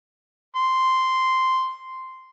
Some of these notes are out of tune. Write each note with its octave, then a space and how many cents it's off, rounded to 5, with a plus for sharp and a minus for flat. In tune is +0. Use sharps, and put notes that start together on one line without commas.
C6 -5